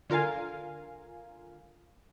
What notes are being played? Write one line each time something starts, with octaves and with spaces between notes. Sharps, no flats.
D3 F4 A#4 F5 G#5